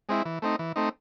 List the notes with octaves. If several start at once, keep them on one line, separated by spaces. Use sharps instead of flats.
G#3 C4 E4
E3
A3 C4 D#4
E3
A3 C4 D#4